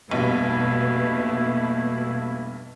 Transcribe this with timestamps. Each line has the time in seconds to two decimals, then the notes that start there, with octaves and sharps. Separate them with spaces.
0.11 F1 B1 G2 B2 A3 A#3 E4